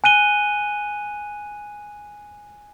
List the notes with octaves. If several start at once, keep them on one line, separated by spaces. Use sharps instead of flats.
G#5 F#6 D#7 G7